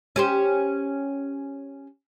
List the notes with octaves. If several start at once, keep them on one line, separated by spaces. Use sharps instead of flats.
C#4 G4 C5